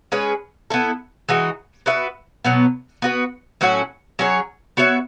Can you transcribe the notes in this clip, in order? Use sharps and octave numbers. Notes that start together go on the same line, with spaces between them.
G#3 C#4 G#4 B4
B3 E4 A4
E3 G#3 D#4 F#4
B3 F#4 B4 E5
B2 F#3 B3
B3 F#4 B4
A2 F#3 C#4 F#4
F#3 C#4 G#4 C#5
B3 F#4 C#5 E5